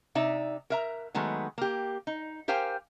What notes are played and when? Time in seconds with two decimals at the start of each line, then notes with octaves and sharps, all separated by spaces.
0.15 C3 D#4 D5 E5
0.70 A#4 E5 A#5
1.15 D#3 F#3 G#3 A3 B3
1.58 A#3 G4
2.07 D#4
2.48 G4 A#4 C5 F5 G5 G#5